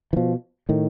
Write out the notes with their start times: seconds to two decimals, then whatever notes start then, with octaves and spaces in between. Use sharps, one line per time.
0.13 E3
0.16 B2 F3
0.69 A2 D#3